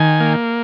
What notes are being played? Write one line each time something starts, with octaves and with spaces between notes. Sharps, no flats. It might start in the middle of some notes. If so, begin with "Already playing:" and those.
Already playing: D#3 G#5
A#3